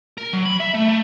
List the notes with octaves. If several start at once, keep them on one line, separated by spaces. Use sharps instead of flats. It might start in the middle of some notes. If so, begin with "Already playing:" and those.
A#4
F#3
B5
E5
A3
A3